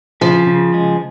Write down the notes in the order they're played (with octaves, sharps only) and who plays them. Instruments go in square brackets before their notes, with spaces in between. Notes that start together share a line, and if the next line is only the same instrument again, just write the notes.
[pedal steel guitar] C#3 [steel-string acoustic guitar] F3
[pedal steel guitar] C#3
G#3